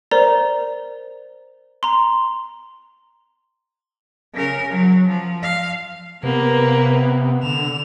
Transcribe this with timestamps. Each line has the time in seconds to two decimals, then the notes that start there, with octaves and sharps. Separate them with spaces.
0.11 A#4 C5 D5 A#5
1.83 A#5 C6
4.34 C#3 A#4
4.70 F#3
5.08 F3
5.43 F5
6.23 C3 A#3 B3 B4
7.43 D3 E7 F7